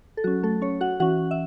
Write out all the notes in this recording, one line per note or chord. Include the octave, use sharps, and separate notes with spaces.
A4
F#3 C#4 F#4
A3 A4
C#4 C#5
F#4 F#5
E3 C#4 F#4 F#5
E5